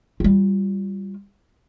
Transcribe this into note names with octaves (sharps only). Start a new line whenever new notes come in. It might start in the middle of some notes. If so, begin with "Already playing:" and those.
G3 F4